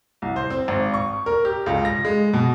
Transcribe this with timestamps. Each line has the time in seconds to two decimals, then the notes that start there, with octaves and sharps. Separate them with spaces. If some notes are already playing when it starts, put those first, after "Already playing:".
0.22 C2
0.36 C5
0.50 C4
0.68 G#1
0.94 C#6
1.26 A#4
1.45 G4
1.66 C#2
1.85 A#6
2.05 G#3
2.33 B2